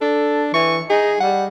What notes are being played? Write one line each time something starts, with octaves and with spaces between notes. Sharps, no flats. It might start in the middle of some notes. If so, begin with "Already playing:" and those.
D4 A4
E3 C#6
D#4 G#4
G3 F#5